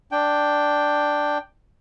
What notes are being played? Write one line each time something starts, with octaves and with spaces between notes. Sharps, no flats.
D4 G5